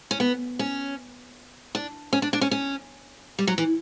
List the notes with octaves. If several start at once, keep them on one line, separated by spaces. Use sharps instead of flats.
C#4
B3
C#4
D4
C#4
D4
D4
C#4
C#4
G3
F#3
E3